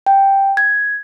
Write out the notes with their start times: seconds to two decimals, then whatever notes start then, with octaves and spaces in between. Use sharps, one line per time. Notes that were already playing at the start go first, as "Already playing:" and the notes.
0.06 G5
0.57 G#6